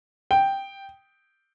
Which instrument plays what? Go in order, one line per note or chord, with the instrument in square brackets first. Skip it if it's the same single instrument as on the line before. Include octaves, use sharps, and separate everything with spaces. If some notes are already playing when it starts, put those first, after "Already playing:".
[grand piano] G5